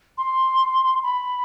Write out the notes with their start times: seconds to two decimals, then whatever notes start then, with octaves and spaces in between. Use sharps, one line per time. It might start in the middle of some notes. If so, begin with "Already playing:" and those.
0.18 C6
1.03 B5